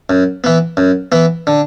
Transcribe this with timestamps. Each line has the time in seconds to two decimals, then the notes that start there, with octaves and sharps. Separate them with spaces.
0.10 F#2
0.44 E3 B3
0.77 F#2
1.12 E3 B3
1.47 D3